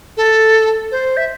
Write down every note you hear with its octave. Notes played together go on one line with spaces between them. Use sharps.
A4
C5
E5